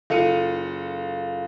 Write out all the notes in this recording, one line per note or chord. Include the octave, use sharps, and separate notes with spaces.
F#1 F4 A4 C#7 D#7